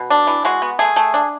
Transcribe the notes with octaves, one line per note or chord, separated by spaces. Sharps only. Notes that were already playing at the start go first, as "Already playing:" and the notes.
Already playing: B2
D4
E3
G#3 F#4
B3
A3 G#4
A3
D4